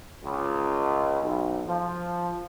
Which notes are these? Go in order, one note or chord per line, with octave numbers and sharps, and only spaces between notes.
C#2
B1
F3